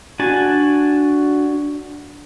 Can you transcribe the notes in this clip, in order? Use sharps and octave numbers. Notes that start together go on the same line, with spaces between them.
D4 F#4 G#5 A5